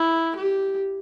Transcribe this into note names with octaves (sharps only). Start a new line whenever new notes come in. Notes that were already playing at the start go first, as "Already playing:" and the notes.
Already playing: E4
G4